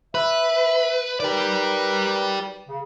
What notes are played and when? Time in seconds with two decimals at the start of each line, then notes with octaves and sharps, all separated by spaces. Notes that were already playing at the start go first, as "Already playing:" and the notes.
0.15 B4 E5
1.20 D#4 G4 A#4 B4 D5
2.68 C#3